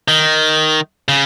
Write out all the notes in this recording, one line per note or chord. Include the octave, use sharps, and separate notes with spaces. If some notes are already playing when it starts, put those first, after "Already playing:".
D#3
C#3